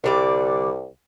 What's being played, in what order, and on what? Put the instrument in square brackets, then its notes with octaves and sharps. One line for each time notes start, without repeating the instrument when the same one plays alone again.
[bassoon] C2 [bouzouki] D3 G3 D5